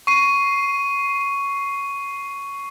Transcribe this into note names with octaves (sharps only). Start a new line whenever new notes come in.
C#6 C7 D#7